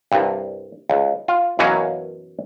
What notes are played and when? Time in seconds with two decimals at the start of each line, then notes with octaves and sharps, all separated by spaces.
0.12 C2 G2
0.90 C#2
1.28 F4
1.59 F#2 B2 E3 F#3 A#3 C#4